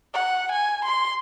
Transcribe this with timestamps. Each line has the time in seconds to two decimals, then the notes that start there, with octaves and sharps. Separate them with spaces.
0.13 F#5
0.52 G#5
0.85 C6